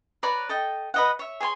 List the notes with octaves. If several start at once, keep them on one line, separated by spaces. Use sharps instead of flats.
B4 C#5 D5 A#5
A4 D#5 G5
B4 D#5 F#5
C#5 E5
G#4 C#5 G#5 C6